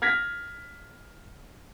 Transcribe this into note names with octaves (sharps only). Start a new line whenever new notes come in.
F6 G#6 A#6 B6